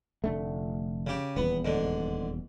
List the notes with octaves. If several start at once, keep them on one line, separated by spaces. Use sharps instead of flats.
F1 D3 A3
C#3 G4
D#1 E2 B3
G#2 D3